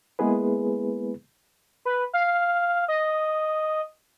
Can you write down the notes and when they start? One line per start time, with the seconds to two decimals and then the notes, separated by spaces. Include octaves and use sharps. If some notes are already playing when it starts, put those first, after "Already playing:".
0.19 G#3 A#3 B3 E4 G#4 B4
1.85 B4
2.13 F5
2.88 D#5